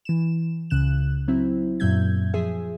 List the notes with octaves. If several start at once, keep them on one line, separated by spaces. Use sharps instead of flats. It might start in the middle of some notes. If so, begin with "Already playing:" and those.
E3 E7
C#2 C#3 F#6 E7
F#3 C4 E4
F#2 A#2 F#3 E5 G6 G#6
F3 G#4 E5